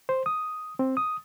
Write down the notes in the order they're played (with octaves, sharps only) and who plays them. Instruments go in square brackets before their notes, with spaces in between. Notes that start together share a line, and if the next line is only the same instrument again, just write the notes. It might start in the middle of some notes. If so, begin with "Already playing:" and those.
[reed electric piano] C5
D#6
C4
D#6